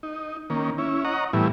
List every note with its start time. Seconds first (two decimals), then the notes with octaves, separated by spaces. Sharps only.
0.03 D#4
0.50 D#3 A#3 C#4
0.78 C#4 E4
1.05 C#5 D#5 F#5 A#5
1.33 A2 E3 G3 B3 E4